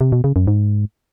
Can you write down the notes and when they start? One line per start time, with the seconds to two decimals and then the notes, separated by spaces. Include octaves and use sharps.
0.01 C3
0.12 B2
0.24 C#3
0.36 F#2
0.47 G#2